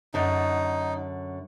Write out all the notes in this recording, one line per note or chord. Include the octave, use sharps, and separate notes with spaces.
F#2 D3 D#4